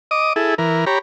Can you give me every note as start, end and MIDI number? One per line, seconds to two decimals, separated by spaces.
0.11 0.33 75
0.11 0.33 86
0.11 0.33 87
0.36 0.55 64
0.36 0.55 68
0.36 0.55 69
0.58 0.85 52
0.58 0.85 70
0.87 0.99 67
0.87 0.99 73
0.87 0.99 82
0.87 0.99 83